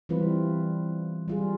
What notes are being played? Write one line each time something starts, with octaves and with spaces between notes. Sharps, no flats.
E3 G3 C4 F4 B4
G3 F4 G#4